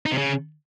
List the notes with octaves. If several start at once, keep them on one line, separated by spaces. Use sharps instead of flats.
D#4
C3
C#3